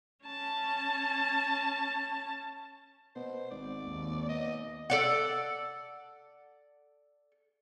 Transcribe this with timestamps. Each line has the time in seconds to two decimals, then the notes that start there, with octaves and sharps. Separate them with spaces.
0.26 C#4 A5
3.16 B2 C5
3.51 G#1 D5
3.88 D#2
4.29 B2 D#5
4.90 A4 D5 F#5